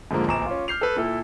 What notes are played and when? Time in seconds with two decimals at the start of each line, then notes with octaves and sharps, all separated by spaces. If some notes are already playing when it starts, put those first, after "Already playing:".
0.11 G#2 D3 F3 G#3 A#3
0.27 D1 A#1 A#5 D6 E7
0.46 C#4 F4
0.68 F6 G6 C7 F7
0.81 A4 B4
0.97 A#2 E4 A4